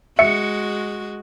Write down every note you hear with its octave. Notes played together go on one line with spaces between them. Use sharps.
G#3 F#4 E5 C#7